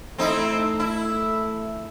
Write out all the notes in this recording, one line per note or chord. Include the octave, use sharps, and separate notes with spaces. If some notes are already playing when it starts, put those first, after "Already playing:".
A3 C4 D#4 E4
E4